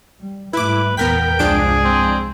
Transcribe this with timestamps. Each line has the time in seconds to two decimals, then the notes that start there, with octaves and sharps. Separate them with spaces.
0.20 G3
0.53 G#2 G3 A3 E4 B4 D6
0.97 G#1 E2 A#2 B3 A#4 G5 B6
1.39 C2 G2 F3 G#3 D4 G#4 D7
1.85 C4